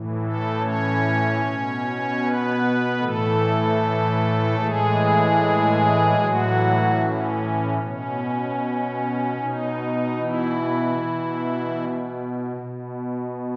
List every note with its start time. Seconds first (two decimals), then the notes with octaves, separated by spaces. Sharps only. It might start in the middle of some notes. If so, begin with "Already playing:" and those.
Already playing: A2 E3
0.21 A3 A4
0.61 C#4 C#5
1.41 B2
2.20 B3 B4
2.99 A2 E3 A3 A4
4.59 A2 E3 G#3 G#4
6.19 A2 E3 F#3 F#4
6.99 C#4
7.78 B2 C#4
9.38 B2 D#4
10.17 E3 E4
10.97 B2
12.57 B2